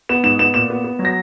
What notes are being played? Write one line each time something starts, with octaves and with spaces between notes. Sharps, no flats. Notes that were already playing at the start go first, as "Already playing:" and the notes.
B3 E7
G#2 E7
B3 E7
A#2 E7
B3
B3
F#3
A#6